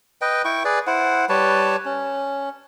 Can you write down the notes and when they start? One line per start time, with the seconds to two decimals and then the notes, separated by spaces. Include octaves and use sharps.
0.21 B4 D#5 G5
0.45 E4 G5 C#6
0.65 G#4 B4 D5
0.87 E4 C5 F#5
1.29 G3 B4 C#5 A5
1.85 C#4